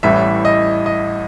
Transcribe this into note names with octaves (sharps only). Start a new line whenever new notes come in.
A1 A2 E3 G3 E5
D#5
D#5